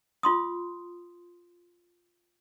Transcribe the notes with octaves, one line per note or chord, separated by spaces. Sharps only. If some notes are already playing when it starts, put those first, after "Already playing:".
F4 C6 D#6